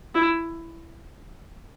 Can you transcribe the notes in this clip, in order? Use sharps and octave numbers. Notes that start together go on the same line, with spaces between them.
E4